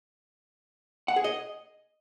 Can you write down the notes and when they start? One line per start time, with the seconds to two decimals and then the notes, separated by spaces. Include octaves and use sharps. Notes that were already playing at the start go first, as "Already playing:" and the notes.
1.08 F#5
1.16 G#4
1.24 D#5